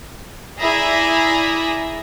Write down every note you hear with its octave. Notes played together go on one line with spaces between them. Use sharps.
E4 G#4 D5 E5 A#5 B5